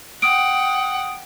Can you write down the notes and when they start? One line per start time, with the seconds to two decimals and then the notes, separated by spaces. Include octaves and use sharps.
0.22 F#5 G5 D#6 D7